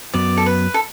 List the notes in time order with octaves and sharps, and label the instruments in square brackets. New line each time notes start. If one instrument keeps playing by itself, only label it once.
[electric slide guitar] F#2 F#3 B3 [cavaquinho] D5
[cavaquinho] A4
B4
A4